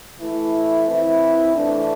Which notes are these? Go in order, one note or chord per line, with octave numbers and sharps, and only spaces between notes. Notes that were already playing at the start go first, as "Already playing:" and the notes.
E3 A3 E4
E3 C4 E4
E3 A3 D4